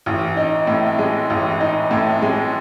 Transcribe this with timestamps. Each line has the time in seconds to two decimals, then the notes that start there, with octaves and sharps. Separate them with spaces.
0.06 A1
0.37 D#4
0.67 A2
0.99 G#3
1.30 A1
1.60 D#4
1.91 A2
2.22 G#3